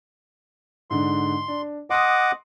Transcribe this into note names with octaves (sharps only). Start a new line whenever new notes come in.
G#2 D3 C6
D4
D#5 F#5 C6 D6 D#6